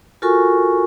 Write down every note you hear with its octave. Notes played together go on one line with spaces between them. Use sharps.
F4 F#4 A4 A#4 G#5 C#6